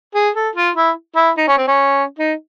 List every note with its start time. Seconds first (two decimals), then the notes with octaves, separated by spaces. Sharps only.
0.15 G#4
0.35 A4
0.56 F4
0.76 E4
1.16 E4
1.38 D#4
1.48 C#4
1.57 C4
1.68 C#4
2.19 D#4